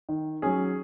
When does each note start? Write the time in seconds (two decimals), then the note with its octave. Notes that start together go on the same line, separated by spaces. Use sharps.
0.09 D#3
0.42 F#3 C#4 G#4